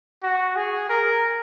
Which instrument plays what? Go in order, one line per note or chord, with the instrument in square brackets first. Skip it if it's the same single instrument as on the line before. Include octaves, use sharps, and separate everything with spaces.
[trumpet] F#4
G#4
A#4